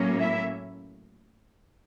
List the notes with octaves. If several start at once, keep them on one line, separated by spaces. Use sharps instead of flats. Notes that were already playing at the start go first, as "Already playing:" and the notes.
Already playing: A2 F#3 A#3 C#4
E4 E5